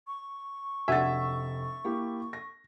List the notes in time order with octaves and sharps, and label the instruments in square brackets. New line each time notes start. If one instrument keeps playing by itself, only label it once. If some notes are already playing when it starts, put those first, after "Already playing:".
[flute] C#6
[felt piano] F1 A6 [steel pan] D4 F#4 G#5 [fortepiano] E5
[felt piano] A#3 E4 G4
A#6